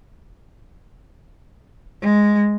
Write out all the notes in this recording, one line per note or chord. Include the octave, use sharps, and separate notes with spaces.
G#3